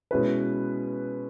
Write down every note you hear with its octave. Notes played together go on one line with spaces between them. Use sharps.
B2 G#3 C#4 E4 B4